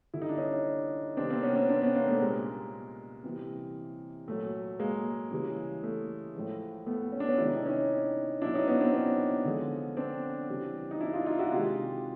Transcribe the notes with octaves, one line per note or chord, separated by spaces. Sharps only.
D3 G3 E4
D#4
D4
C#4 D#4
C3 D#3 G3 C4 D4
A#3 C4
B3 C#4
C4 D4
C4 D4
B3 C#4
A#3 C4
A3 B3
A#2 G3 G#3 A#3
C3 E3 G3
A#2 F#3 A3
G#3 A#3
C#3 E3 G3
A3
A2 F3 G#3
A3 B3
C#4
D4
B3 C#4
C3 D#3 G#3 E4
D#4
D4
C#4 D#4
B2 F#3 D4 E4
C#4 D#4
B3 C#4
C4 D4
B3 C#4
D3 F3 G#3
C4 D4
C#3 E3 G3
D#4
D4 E4
D#4 F4
D#4 F4
E4 F#4
C3 D#3 G#3 F4 G4